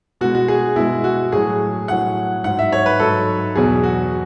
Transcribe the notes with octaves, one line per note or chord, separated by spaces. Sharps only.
B2 G#3 F#4
F#4
G#4
B2 G#3 E4
F#4
A2 F#3 G#4
A2 F#3 F#5
G#2 F#3 F#5
E5
C#5
B4
G#2 F#3 A4
E2 B2 F#3 G#4
F#4